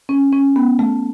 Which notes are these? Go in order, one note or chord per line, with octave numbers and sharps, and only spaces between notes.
C#4
C#4
B3
A3